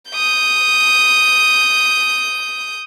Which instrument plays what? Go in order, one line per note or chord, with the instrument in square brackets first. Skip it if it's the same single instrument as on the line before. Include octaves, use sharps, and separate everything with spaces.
[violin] D#6 G6